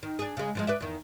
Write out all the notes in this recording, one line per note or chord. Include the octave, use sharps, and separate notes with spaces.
D#3
D4 G#4
C#3 G#3
D3 F3 G#3
B4 D5 E5
E2 D#3